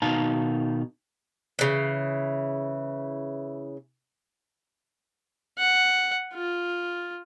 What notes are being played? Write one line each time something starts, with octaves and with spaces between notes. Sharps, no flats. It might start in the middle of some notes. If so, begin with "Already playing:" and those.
B2 D#3 D#4 F5 A5 A#5
C#3 E3
F#5
F4